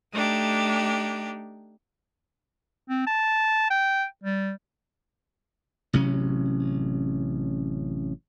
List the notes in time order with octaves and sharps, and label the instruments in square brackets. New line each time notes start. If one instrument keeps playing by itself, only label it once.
[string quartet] A3 D4 D#4 G4
[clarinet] C4
A5
G5
G3
[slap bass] A1 C3 F#3 C#4